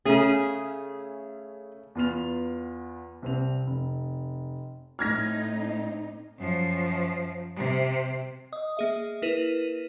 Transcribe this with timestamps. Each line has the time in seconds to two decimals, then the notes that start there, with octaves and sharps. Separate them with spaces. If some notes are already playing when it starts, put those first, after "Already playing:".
0.05 C#3 A3 C#4 G#4
1.95 E2 B3 F4 B4 F6 F7
3.22 C2 C4 F7
3.67 F1
4.99 A2 C4 D#4 F6 G#6 A#6
6.39 F#2 F3
7.56 C3
8.53 D#5 D#6
8.77 A#3 G#4 E5
9.22 A#3 E4 A#4 B4 D#7